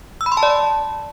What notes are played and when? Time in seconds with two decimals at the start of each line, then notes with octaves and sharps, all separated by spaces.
0.21 E6
0.26 B5
0.32 C6
0.37 A5
0.43 D5